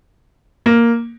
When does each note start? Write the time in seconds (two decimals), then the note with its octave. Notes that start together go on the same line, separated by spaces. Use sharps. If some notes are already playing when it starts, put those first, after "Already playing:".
0.66 A#3